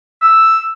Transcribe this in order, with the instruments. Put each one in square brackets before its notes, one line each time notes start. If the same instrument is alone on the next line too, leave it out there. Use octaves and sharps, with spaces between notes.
[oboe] E6